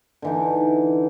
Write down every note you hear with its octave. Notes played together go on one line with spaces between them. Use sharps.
D3 E3 D#4